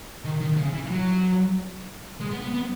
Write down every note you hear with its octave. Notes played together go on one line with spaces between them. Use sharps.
D#3
D#3
C#3
E3
F#3
G#3
B3
B3
B3